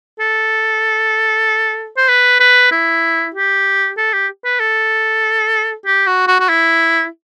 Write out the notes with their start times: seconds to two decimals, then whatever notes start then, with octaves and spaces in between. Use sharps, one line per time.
0.20 A4
1.97 C5
2.08 B4
2.40 B4
2.72 E4
3.34 G4
3.97 A4
4.13 G4
4.45 B4
4.60 A4
5.86 G4
6.07 F#4
6.27 F#4
6.40 F#4
6.49 E4